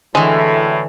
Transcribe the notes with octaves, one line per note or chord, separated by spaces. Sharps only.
F#2 A2 D3 E3 G#3